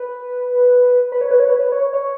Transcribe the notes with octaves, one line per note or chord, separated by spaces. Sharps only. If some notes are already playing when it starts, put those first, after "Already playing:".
Already playing: B4
B4
C#5
B4
C#5
B4
C#5
C#5